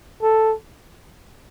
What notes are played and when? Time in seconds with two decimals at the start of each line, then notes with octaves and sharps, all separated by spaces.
0.22 A4